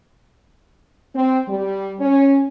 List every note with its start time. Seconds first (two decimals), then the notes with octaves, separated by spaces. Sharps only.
1.15 C4
1.48 G3
2.00 C#4